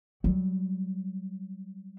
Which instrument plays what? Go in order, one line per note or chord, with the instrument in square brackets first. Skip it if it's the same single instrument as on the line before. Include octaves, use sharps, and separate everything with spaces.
[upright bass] F#3 G3